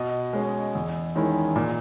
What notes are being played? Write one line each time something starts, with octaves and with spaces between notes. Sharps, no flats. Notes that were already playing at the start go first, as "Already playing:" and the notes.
Already playing: B2 D#5
G#3 C#4
E2
D#3 G#3 C#4 E4
A#2